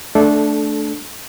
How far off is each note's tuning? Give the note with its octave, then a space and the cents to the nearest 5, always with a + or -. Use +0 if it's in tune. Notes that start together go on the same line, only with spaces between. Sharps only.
A3 +0 D4 +0 A4 -20